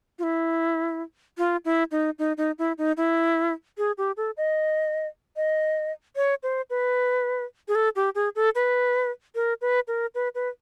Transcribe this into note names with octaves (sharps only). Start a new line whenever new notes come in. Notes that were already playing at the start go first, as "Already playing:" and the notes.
F4
E4
F4
E4
D#4
D#4
D#4
E4
D#4
E4
G#4
G4
A4
D#5
D#5
C#5
C5
B4
G#4
A4
G4
G#4
A4
B4
A#4
B4
A#4
B4
B4